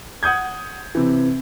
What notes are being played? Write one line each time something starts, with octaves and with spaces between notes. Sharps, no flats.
F#5 D#6 G6 G#6
C3 E3